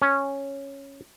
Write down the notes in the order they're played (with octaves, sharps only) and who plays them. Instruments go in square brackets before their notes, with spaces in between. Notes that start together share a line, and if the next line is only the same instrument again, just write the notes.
[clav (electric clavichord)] C#4